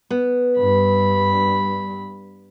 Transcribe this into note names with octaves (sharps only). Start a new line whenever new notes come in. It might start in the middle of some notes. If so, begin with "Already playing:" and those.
B3
G2 B5